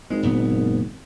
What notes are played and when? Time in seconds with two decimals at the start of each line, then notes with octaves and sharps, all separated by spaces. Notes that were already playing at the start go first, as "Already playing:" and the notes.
0.10 G#1 G#3
0.23 F#1 A#2 B3